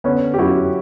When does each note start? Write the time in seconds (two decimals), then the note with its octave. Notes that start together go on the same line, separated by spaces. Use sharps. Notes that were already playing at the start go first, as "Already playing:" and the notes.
0.04 D3 B3 C#4
0.34 G4
0.38 F#2 E4 F#4